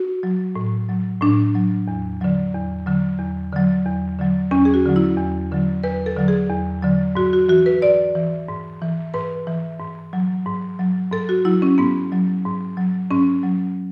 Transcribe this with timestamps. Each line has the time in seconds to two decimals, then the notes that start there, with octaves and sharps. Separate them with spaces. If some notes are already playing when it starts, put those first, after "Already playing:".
Already playing: F#4
0.23 F#3
0.56 A2
0.89 F#3
1.21 A2 D4
1.55 F#3
1.88 E2
2.21 D3 F#3
2.54 E2
2.86 D3 F#3
3.19 E2
3.52 D3 F#3
3.86 E2
4.19 D3 F#3
4.51 E2 C#4
4.65 G#4
4.74 F#4
4.85 D3 F#3
4.96 E4
5.18 E2
5.51 D3 F#3
5.84 E2 B4
6.06 A4
6.17 D3 F#3
6.28 G#4
6.50 E2
6.83 D3 F#3
7.15 G#2 F#4
7.33 F#4
7.49 E3 F#4
7.66 B4
7.82 G#2 D5
8.15 E3
8.48 G#2
8.82 E3
9.14 G#2 B4
9.47 E3
9.80 G#2
10.13 F#3
10.46 G#2
10.79 F#3
11.12 G#2 A4
11.29 F#4
11.45 F#3 E4
11.62 C#4
11.78 G#2 B3
12.12 F#3
12.45 G#2
12.77 F#3
13.11 G#2 C#4
13.43 F#3